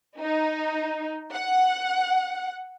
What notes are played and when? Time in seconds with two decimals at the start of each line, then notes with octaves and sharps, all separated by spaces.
0.20 D#4
1.34 F#5